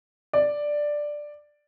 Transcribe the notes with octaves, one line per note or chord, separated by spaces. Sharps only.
D5